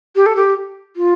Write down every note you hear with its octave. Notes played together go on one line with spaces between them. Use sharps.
G4
A4
G4
F4